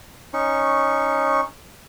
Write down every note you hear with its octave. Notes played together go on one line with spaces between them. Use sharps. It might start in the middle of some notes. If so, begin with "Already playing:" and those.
C#4 D#4 C#6